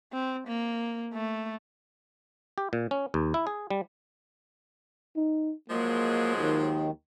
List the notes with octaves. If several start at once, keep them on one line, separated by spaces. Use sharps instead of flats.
C4
A#3
A3
G4
A#2
C#4
D#2
E4
G#4
G3
D#4
F3 F#3 G#3 A#3
D#2 D#3